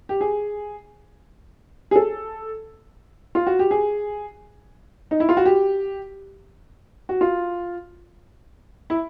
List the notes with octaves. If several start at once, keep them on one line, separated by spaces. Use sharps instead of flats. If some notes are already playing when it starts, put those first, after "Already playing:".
G4
G#4
G#4
A4
F4
F#4
G4
G#4
D#4
E4
F4
F#4
G4
F#4
F4
E4